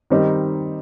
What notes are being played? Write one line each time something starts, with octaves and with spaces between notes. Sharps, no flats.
D#3 G3 C4 D#4